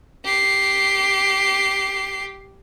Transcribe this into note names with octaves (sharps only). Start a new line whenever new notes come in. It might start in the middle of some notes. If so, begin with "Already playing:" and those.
G4 C7